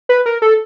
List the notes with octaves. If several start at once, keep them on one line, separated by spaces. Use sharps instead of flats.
B4
A#4
A4